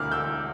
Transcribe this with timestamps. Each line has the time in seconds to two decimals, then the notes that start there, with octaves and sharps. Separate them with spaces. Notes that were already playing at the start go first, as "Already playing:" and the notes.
Already playing: E1 D2 D3 D6 F6
0.11 E6 G6